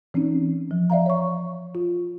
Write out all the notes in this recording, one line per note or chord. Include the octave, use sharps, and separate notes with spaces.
E3 C4 C#4 D#4
F3
D5 E5 F5 A#5
C#5 C#6
F4